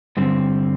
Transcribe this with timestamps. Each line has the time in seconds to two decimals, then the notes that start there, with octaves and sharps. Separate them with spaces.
0.17 G2 D3 G3 C4